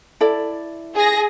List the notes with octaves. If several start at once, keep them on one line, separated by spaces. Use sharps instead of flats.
E4 A4 D5
G#4 A#6